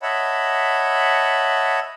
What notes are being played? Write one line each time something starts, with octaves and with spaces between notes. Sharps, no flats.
C#5 D#5 E5 F#5 A5 B5